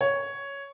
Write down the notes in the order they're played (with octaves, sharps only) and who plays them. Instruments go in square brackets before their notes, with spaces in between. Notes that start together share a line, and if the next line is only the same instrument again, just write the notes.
[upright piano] C#5